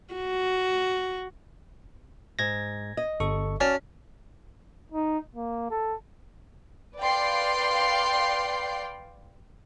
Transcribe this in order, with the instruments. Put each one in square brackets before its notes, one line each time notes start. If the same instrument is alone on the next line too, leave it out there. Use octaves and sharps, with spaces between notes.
[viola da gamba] F#4
[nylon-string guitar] G#2 [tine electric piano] G#6 A#6
[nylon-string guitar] D#5
[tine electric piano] G1 A4 C#6
[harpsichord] C#4 [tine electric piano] F#4 A5 F6 [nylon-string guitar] D5
[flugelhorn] D#4
A#3
A4
[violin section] B4 D5 F5 G5 C6